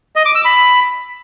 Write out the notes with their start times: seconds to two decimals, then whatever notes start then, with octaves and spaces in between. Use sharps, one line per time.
0.16 D#5
0.25 D6
0.35 E6
0.45 B5